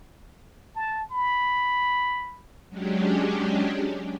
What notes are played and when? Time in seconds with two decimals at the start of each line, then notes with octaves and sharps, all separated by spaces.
0.76 A5
1.11 B5
2.69 F#3 G#3 C#4 D4 G4